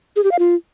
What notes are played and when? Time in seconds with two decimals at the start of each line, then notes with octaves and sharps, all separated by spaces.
0.16 G#4
0.24 G4
0.31 F5
0.39 F4